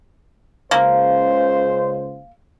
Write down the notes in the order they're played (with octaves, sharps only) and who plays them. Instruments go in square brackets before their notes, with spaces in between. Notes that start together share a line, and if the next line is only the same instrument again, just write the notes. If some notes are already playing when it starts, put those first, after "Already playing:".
[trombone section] C#2 C#3 C5 [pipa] A#3